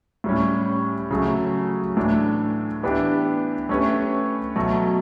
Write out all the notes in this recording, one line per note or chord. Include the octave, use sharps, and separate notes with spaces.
A2 G3 C#4
C#3 F#3 A3
A2 E3 A3 D4
E3 B3 D4 G4
A3 C#4 G4 B4
B2 F#3 A3